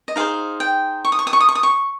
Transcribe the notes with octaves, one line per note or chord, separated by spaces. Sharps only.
D#5
D#4 G#4 C5 F5
G5
C#6
D#6
C#6
D#6
C#6
D#6
C#6
D#6
C#6